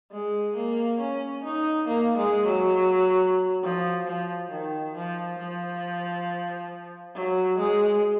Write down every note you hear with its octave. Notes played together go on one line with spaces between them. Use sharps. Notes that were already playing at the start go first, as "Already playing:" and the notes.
G#3
A#3
C#4
D#4
A#3
G#3
F#3
F3
F3
D#3
F3
F3
F#3
G#3